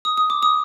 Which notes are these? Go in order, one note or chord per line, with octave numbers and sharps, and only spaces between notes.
D#6
D#6
D6
D#6